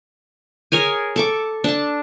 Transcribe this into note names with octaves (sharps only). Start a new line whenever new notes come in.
G#4 A#4 C#5 G#5
A4 C#6 D6
D4 A5